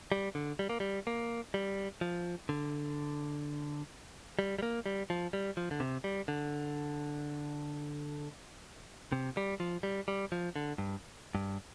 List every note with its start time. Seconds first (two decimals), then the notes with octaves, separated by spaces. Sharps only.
0.12 G3
0.35 D3
0.59 G3
0.69 A#3
0.80 G3
1.07 A#3
1.54 G3
2.01 F3
2.49 D3
4.39 G3
4.59 G3
4.63 A#3
4.86 G3
5.10 F3
5.33 G3
5.57 F3
5.71 D3
5.80 C3
6.04 G3
6.28 D3
9.12 C3
9.37 G3
9.60 F3
9.83 G3
10.08 G3
10.32 F3
10.56 D3
10.78 G2
11.35 G2